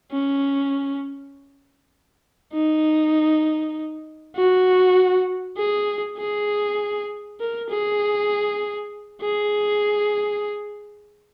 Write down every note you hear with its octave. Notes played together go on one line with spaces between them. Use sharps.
C#4
D#4
F#4
G#4
G#4
A#4
G#4
G#4